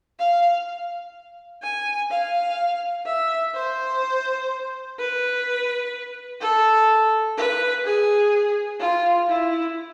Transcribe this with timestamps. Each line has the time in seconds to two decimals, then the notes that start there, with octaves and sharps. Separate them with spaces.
0.19 F5
1.62 G#5
2.10 F5
3.06 E5
3.55 C5
4.98 B4
6.41 A4
7.37 B4
7.85 G#4
8.80 F4
9.29 E4